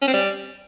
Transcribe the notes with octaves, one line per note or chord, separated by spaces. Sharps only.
C#4
C4
G3